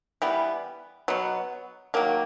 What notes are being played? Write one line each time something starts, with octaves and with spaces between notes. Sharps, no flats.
E3 G3 B3
B2 F#3 B3
D#3 F#3 A#3